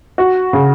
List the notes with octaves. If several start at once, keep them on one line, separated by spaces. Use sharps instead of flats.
F#4
C#3